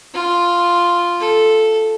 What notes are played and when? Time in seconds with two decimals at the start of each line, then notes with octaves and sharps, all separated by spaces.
0.14 F4
1.20 A4